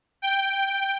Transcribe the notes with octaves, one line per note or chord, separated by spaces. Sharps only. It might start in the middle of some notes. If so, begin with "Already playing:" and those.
G5